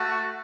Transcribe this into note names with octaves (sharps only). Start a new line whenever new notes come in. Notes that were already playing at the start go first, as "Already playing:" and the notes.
Already playing: A3 F#4